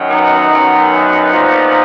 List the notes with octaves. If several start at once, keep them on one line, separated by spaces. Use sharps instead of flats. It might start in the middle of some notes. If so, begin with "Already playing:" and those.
Already playing: F#2 D#3 F#3
B3 D#4
F#2 D#3 F#3
A#2 F3